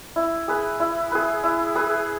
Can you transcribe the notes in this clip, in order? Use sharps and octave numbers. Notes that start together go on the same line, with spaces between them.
E4
G#4 B4
E4
G#4 B4
E4
G#4 B4